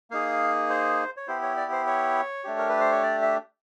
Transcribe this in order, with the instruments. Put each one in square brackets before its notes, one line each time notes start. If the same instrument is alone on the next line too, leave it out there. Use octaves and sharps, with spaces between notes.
[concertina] A#3 D#4 G#4 F5
C5
C#5
B3 E4 G4 C5
C#5
D5
C5
C#5
A3 D4 G4
A#4
B4
C5
C#5
D5
E5